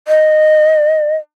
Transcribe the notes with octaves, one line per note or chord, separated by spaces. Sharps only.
D#5